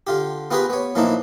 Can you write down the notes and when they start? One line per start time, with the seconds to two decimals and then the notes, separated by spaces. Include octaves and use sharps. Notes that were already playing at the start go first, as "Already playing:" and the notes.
0.07 D3 F4 G4
0.51 B3 F4 G4 G#4 A#4 B4
0.70 B3 C#5
0.95 A#2 E3 F3 A#3 D4 D#4